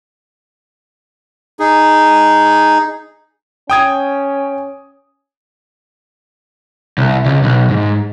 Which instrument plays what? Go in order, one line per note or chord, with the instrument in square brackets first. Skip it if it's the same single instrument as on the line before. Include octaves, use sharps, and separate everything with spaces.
[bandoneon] D#4 G#4
[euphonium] C#4 [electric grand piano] G5 D#6 G#6
[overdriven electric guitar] C2
C#2
B1
G#2